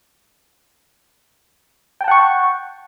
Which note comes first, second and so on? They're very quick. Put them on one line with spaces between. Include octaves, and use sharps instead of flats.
G5 A5 F#5 C#6